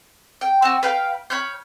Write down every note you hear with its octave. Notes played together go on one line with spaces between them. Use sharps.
G5
C4 F#4
B4 F5 G5
C#5 B5 F6 G6